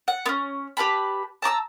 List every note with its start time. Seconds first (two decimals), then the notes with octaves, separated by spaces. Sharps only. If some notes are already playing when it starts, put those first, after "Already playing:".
0.08 F#5
0.26 B3 C#4
0.77 G4 B4 A5 B5
1.42 A5 A#5 D6 E6